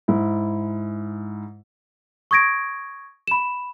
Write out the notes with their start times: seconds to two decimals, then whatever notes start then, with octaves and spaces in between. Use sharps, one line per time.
0.08 G#2 E4
2.31 C#6 D#6 G#6 A#6 D7
3.28 B5 E7